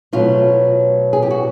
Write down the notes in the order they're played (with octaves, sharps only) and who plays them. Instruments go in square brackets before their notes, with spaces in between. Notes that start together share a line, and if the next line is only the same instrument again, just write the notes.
[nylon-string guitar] B2 F#3 A3 F4
G#4
G4
F#4